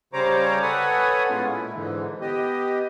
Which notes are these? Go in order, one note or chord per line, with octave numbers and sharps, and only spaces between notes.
C#3 G3 C5 C#5 A#5 D6
A4 B4 C#5 F#5 G#5 D#6
A2 G#3 B3 C#4 F4
A#2 E4
G#2 D3 E3
B3 G4 D#5